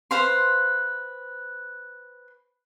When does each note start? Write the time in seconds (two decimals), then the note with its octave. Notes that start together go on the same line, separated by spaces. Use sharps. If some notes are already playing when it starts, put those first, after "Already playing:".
0.11 B4 C5 F5 C6